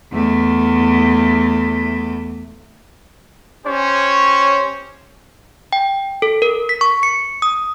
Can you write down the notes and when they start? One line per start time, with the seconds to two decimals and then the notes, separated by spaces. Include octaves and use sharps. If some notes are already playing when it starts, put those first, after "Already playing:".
0.13 E2 A3
3.65 C#4 G4 C5 C#5
5.73 G5
6.22 A4
6.42 A#4
6.69 B6
6.81 C#6
7.03 C#7
7.42 D#6